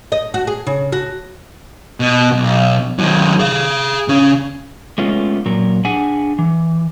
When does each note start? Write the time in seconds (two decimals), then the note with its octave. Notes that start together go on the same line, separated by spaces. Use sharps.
0.12 D#5
0.34 F#4
0.47 G#4
0.67 C#3
0.92 F#4
2.00 B2
2.32 B1
2.99 D#3 F#3
3.40 G#4 F5
4.08 C#3 C#4
4.98 G#3 A3 B3 C#4 F4
5.46 A#2 F#3 A#4
5.85 D4 G#4 F#5 G#5
6.39 E3